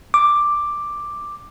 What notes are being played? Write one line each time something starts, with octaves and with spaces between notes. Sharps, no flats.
D6